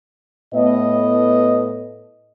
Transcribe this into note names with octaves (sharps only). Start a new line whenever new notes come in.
A2 B3 D#5